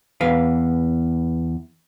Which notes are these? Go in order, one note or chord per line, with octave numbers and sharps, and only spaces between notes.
E2 B4 F5